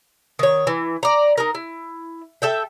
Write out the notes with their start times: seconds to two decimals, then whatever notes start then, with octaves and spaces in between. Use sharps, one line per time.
0.39 D#3 C#5
0.67 E3
1.03 D5 A#5
1.38 D#4 A#4
1.55 E4
2.42 A4 E5 G5